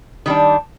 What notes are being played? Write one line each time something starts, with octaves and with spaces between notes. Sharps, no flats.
D#3 G3 D4